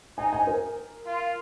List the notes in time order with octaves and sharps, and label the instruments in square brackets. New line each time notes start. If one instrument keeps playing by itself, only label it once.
[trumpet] D#4 [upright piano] G#5
[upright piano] G#5
A#4
[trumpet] F4